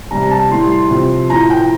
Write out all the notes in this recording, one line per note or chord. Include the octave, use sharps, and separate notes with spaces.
C3 G3 A#5
A#5
A5
A2 G3 C6
C6
C3 F3
A2 F3 A#5
G5